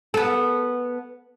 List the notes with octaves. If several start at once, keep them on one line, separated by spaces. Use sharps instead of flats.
B3 A4